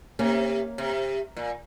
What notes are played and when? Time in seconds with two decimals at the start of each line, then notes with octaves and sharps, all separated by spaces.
0.19 C3 A#3 C#4
0.78 C3
1.37 A#2